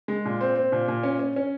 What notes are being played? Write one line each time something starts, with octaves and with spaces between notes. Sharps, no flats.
G#3
A#2
C4
C4
A#2
A#2
C#4
C#4
C#4